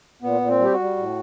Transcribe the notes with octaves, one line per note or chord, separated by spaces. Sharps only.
A#2 B3
A#2
C4
G3 G4
F#4
G3
A2